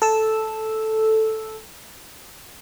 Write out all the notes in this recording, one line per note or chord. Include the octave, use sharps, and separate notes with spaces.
A4 E6